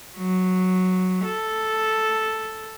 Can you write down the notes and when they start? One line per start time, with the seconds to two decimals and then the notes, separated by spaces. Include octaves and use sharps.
0.17 F#3
1.25 A4